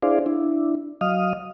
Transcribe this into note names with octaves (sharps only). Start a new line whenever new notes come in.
D4 E4 G#4 C5 D5 F5
D4 E4
F#3 D#5 F5 D#6 F6